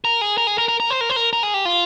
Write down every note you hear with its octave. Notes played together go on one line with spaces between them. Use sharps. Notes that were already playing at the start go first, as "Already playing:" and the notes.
A#4
G#4
A#4
G#4
A#4
A#4
A#4
C5
A#4
C5
A#4
A#4
G#4
G4
F4